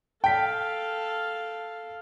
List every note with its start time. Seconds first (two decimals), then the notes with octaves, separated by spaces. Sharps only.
0.24 A4 F5 G5 B6